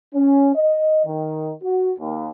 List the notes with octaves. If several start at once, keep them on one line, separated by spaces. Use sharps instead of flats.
C#4
D#5
D#3
F#4
D#2